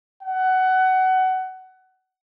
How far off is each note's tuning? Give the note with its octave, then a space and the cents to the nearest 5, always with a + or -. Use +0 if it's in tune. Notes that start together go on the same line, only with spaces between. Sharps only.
F#5 +20